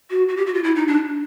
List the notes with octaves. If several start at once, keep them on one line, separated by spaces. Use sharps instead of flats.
F#4
F#4
G4
F#4
F4
E4
D#4
D4